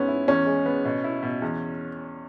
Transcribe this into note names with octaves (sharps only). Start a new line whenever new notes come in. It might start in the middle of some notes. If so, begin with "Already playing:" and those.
Already playing: G#2 B3 C#4
E4
E2 C#4
G#3
B3
B2
E4
B2
E2